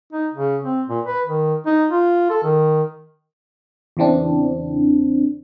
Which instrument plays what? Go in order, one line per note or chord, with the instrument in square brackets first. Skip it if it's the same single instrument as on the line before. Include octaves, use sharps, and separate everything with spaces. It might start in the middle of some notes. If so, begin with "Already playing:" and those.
[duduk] D#4
C#3
C4
A#2
B4
D#3
D#4
F4
A4
D#3
[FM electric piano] E2 C#3 E3 C4 D4